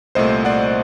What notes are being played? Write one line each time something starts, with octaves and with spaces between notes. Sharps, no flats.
C2 A#2 A3 C5 D#5
D5 F#5